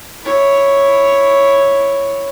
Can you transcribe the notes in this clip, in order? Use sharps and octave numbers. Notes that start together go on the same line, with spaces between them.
E4 C#5